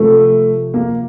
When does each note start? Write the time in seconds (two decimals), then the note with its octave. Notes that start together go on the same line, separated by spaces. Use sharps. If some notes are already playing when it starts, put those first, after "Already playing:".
Already playing: C3 F3 A3
0.74 A#3